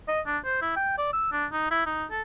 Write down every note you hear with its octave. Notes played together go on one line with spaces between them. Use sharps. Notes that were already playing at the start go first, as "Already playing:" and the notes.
D#5
D4
C5
E4
G5
D5
E6
D4
D#4
E4
D#4
A4